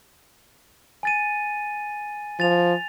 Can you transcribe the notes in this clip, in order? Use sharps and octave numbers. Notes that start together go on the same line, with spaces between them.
G#5 A6 D#7
F3 A6 F7